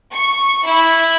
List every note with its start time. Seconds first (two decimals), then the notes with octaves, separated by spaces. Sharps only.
0.14 C#6
0.67 E4